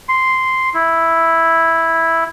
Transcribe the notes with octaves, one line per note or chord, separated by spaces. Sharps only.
C6
E4